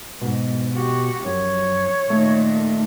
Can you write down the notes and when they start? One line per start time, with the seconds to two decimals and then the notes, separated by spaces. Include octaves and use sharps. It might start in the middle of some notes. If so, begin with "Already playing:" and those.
0.22 G#2 B2
0.73 F#4 G4
1.25 F#2 F3 C#5
2.10 A#2 D#3 A3